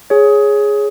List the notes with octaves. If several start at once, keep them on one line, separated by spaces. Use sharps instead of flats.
G#4 C#5